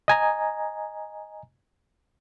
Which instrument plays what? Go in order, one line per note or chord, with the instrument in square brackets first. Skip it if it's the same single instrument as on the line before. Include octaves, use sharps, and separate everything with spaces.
[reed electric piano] D#5 G#5 A#5